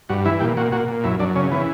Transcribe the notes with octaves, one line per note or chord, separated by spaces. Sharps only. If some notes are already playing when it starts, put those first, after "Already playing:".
G2 F#4
E3 E4
A#2 G4
A#2 F#4
A#2 F#4
A#2
F#2 E4
F#2 D4
C#3 C#4
E3 B3